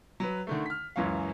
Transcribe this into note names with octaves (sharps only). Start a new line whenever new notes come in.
F#3 B4
D3 D#3 A3
F6 B6
C#2 F#2 E3 F#3 C#4 F5